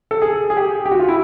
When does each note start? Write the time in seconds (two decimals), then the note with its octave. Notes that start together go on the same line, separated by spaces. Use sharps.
0.11 A4
0.22 G#4
0.50 G#4
0.57 G4
0.86 G4
0.91 F#4
0.99 F4
1.08 E4